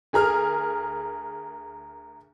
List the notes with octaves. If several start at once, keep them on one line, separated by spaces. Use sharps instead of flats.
D2 G#4 A#4 F6